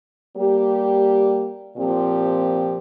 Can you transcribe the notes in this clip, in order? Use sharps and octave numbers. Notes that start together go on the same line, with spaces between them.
G3 A#3 G4
A#2 F3 C4 G4